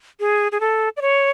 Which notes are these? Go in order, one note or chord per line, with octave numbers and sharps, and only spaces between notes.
G#4
G#4
A4
D5
C#5